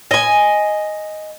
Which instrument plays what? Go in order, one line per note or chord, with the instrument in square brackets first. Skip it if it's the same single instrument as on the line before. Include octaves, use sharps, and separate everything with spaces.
[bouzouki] D#5 G#5